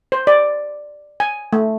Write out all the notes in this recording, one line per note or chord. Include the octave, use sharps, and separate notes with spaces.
C5
D5
G#5
A3